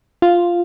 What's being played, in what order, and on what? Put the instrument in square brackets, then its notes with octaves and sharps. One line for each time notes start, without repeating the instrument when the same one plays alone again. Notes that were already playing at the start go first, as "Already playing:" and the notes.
[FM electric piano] F4